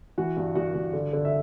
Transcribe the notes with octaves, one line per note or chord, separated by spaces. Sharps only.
E3 F#4 F#5
G2
G2 F#4 F#5
G2
D3
D3
E5